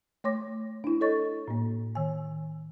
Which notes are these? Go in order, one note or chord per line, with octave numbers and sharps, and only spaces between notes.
A3 C#5 C6 D6 A#6
D4 E4
A4 C#5 D#5 C#6 A6
A2 A#3
D#3 G#5